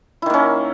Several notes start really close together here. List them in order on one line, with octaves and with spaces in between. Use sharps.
E4 D#3 A#3 C#4